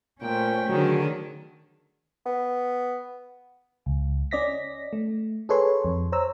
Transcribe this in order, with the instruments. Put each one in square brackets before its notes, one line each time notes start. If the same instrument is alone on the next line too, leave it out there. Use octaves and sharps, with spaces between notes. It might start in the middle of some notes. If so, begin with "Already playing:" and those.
[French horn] A#2 [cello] A3 C#4 [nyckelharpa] C5 G5
[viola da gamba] D3 D#3 G#4 [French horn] F#3
[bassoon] B3
[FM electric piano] C#2
C#4 D5 D#5 A#6 B6
A3
G#4 A4 B4 C#5 C6
F2
C5 C#5 A#5 E6